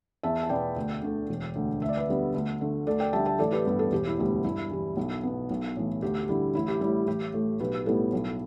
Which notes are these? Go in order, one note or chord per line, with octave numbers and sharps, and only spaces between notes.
E2 E5 A5
A5
B2 B3 D5 G5
D2
D3 A3
E1
D2 D3
D2 E5
D5
B4 E5
D3 G3 B3
D2
D3 A3
D2 A4 D5
D5 G5
D3 G3 E5 A5
E5 A5
A1 A4 D5
G4 B4
G2 G3 B3
A4
E1 G4
E4
D2 D3 G3 B3 G4
G2 E4
E3 G3
B1
B2 B3
B1
A2 E3
D2 G4
D3 G3 E4
A1 E4
G4
A2 G3 E4
A1 G4
A2 A3
B1 G4 B4
A2 G3 B3 E4 A4
B1